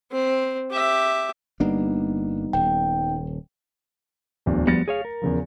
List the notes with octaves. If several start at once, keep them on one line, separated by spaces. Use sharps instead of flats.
C4
G4 E5
G1 G3 A#3 B3 D4 D#4
D#1 G5
D1 E2 D4
F3 G3 B3 A6 A#6 C#7
G#4 C#5 F5
A#4
E2 C#3 F3